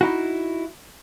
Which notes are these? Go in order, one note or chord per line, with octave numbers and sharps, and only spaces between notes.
D#4 E4 F#4